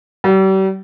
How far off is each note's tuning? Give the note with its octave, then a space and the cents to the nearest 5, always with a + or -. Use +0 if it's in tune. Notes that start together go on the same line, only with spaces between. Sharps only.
G3 -40